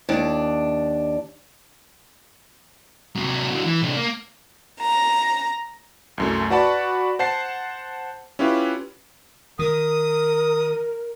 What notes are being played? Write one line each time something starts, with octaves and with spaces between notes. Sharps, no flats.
D#2 D4
C3 F#3
D3 F#3
E3
C3 D4
A#3
A#5
C2 F#2 A3
F#4 B4 D5 F#5 A5 B5
C5 F#5 A5 C7
C#4 E4 F4 G4 B4
D#3 A#4 D#6